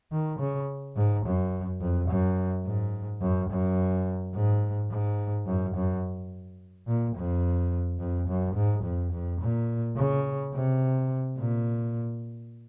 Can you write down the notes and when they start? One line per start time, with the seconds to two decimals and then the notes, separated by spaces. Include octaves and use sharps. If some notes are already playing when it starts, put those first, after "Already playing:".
0.12 D#3
0.39 C#3
0.96 G#2
1.25 F#2
1.80 F2
2.09 F#2
2.65 G#2
3.21 F#2
3.50 F#2
4.34 G#2
4.90 G#2
5.46 F#2
5.75 F#2
6.87 A#2
7.16 F2
7.99 F2
8.28 F#2
8.56 G#2
8.84 F2
9.12 F2
9.41 A#2
9.96 C#3
10.54 C3
11.38 A#2